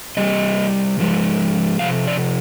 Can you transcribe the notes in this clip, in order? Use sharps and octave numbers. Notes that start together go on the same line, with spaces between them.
C3 G3 D#5
G#2 F3 G#3
C3 F3 F5
D5